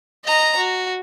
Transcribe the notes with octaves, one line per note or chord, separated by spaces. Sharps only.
D#5 A#5
F#4